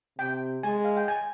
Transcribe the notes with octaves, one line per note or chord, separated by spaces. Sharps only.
C3 G5
G#3 G#5
F5
G5
G#5